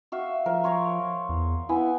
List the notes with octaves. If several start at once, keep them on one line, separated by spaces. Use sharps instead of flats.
F#4 E5 F5
F3 A#4
C5 C#5 A#5
E2
B3 E4 G#5